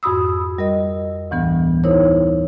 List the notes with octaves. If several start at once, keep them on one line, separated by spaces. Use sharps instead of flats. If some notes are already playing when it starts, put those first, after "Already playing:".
F2 G#2 F#4 B5 D#6 E6
G3 A#4 D#5
D2 A2 E3 G3 B3
D#4 E4 A#4 C5 C#5